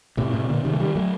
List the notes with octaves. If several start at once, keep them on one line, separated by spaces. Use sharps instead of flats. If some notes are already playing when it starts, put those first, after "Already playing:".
A2 C3
A2 C3
A#2 D3
C3 D#3
A3
D#3 G3
F#3 A3